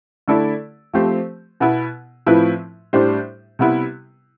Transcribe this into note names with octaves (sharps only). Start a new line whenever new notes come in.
D3 A3 E4 A4 D5
F3 A3 C4 G4 C5
B2 B3 E4
A2 F3 C4 E4 B4
A2 G3 D4 G4 C5
C3 G3 B3 E4